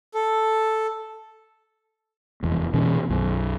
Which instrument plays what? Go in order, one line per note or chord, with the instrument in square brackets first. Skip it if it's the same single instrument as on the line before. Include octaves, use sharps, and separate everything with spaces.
[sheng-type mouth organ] A4
[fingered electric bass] F1 E2
B2 E3 C#4
B1 F#2